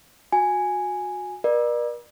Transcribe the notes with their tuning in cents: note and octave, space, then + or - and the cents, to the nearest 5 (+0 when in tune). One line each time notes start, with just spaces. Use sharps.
F#4 -25 G#5 +0
A#4 +45 D5 +35